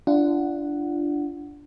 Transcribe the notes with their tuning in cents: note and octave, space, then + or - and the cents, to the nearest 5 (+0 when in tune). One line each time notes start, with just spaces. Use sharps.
D4 -5 F4 -35 F#5 +0